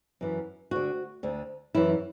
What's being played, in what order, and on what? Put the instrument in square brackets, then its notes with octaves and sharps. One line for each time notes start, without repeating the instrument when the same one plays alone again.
[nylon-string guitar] F#2 E3
D2 D3 F#4
D2 D3
F#2 E3 E4